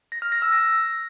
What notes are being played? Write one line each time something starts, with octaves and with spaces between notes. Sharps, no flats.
A#6
F6
A#6
E6
A#6